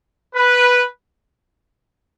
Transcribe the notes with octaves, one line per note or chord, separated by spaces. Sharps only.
B4